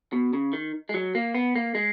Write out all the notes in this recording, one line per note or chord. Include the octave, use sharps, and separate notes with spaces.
B2
C#3
D#3
G#3
F#3
A#3
B3
A#3
G#3